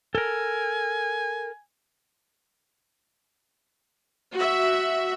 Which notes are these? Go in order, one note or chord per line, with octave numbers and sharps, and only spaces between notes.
A4 A#4 G#5
F#4 E5